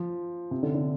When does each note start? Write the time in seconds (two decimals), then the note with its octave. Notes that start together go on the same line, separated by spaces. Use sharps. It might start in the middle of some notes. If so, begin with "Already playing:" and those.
Already playing: F3
0.51 C3
0.63 D3
0.74 D3